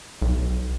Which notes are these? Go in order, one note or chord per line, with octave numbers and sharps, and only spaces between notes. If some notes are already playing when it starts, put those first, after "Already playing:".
B1